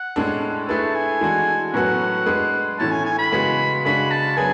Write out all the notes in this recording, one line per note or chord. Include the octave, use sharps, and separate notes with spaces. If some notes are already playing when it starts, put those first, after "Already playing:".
Already playing: F#5
A2 G#3 D4 A4
A3 E4 G#4 B4 A5
G#5
E3 G#3 D4 F#4 A4
A2 F#3 B3 F#4 A4 F#5
G#3 D4 G#4 B4
A2 E3 A3 C#4 A5
G#5
G#5
B5
C#3 G#3 B3 F#4
C#3 G#3 D4 F#4 B5
A5
F#3 B3 D4 G#4 G#5